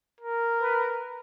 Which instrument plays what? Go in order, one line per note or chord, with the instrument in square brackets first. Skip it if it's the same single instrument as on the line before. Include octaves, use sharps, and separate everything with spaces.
[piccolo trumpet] A#4
[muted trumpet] B4